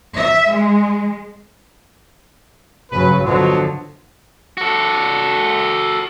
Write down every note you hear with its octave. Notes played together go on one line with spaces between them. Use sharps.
E5
G#3
G2 C#3 F#3 B4
B2 D3 F3 F#3
F#4 A4